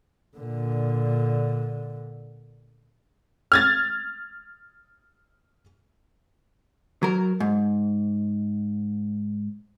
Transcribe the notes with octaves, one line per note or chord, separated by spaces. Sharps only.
A#2 D3
F6 G#6 A6
F#3 A#4
G#2